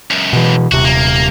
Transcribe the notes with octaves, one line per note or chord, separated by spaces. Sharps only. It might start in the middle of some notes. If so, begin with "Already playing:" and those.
C#2 F#2
B2 E3
D#1 C3 F#4
A#3